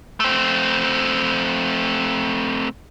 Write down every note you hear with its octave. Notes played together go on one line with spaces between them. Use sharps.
A3 C4